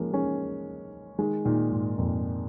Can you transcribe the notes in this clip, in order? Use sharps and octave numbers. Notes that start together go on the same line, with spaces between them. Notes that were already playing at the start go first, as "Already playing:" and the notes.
Already playing: F3 G#3 A#3 C#4
G#3 C#4
D#3 G#3
A#2 D#3
G#2
F2 A#2